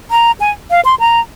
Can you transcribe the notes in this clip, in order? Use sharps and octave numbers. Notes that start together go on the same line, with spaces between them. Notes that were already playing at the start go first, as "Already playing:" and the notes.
A#5
G#5
F5
C6
A#5